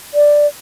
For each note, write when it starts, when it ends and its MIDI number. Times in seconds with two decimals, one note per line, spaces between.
0.14 0.47 74